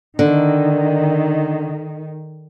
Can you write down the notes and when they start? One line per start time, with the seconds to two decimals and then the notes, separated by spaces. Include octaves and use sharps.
0.19 D3 D#3